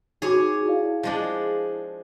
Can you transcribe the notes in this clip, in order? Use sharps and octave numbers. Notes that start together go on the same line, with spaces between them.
D#4 F#4 G#4 C#5 D6
E4 D5 F5
F3 G#3 D4